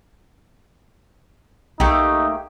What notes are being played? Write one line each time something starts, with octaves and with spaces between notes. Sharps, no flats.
B1 A3 A#3 D#4 G4